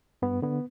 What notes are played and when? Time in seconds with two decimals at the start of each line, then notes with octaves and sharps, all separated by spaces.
0.22 G2 B3
0.42 D3 B3